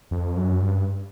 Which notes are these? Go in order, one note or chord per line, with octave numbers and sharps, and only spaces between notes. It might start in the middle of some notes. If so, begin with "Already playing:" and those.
F2
F#2
G2